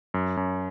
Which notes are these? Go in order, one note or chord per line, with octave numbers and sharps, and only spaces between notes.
F#2
F#2